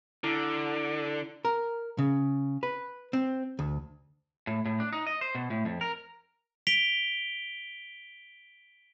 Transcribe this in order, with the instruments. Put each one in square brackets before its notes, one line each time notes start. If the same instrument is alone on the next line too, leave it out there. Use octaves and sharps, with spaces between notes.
[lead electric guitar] D3 [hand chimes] E4
[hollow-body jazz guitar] A#4
C#3
B4
C4
D2
[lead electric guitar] A2
A2
D4
D#4
D#5
C5
B2
A2
F2
A#4
[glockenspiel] B6 D7 F7 G7